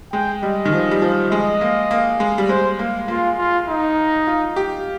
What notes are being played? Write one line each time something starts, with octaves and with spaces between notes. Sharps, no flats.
G#3 G5
G3 D#5
D#3
F3
G3
F3
G#3 D#5
A#3
A#3
G#3
G3
G#3 C5
A#3
A#3 F4
F4
D#4
F4
G4